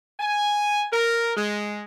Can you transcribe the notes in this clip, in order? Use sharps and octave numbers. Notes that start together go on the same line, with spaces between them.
G#5
A#4
G#3